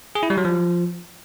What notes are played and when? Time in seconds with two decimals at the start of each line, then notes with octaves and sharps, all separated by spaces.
0.15 G#4
0.23 E4
0.30 G3
0.37 F#3
0.45 F3